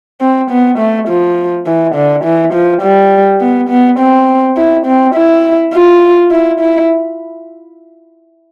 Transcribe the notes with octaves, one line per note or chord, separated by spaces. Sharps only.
C4
B3
A3
F3
E3
D3
E3
F3
G3
B3
B3
C4
E4
C4
E4
F4
E4
E4